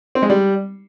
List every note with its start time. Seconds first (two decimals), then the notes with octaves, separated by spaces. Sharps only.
0.15 C4
0.22 G#3
0.30 G3